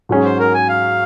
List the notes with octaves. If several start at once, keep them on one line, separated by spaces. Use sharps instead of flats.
G#2 F#3 C#4 G#4
C5
A#4
G#5
F5